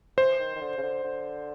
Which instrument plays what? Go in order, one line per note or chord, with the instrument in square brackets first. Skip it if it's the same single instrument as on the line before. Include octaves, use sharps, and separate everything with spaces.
[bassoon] E3 [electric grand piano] C5
[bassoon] D#3
D#3
D3
C#3
D3
D3